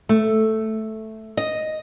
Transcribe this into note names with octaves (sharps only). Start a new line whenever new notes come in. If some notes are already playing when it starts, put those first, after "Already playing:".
A3
D#5